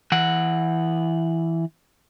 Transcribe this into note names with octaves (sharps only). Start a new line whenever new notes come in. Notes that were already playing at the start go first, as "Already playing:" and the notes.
E3 F#5